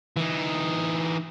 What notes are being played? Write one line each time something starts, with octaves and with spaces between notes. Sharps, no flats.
E3 D#4